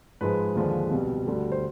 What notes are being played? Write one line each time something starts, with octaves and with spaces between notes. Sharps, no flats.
G#2 F3 G#3 B4
D#2 D3 F3 G#3
C2 B2 G3
D2 D3 G3
C5